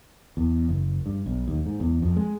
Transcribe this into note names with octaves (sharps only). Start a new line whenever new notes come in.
E2
F#1
G2
B1
D#2
G#2
E2
F2
G#3